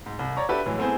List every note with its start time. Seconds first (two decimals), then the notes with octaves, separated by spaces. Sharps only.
0.06 G#2
0.19 C2
0.37 C#5 D5 A#5 C#6
0.49 D4 F#4 G4 A4 B4 E5
0.66 A2 E3 F#3 G#3
0.78 A3 B3 C4 E4 G#4 C5